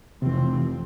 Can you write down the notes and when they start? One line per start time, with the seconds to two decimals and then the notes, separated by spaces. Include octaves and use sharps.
0.22 F1 C3 E3 C4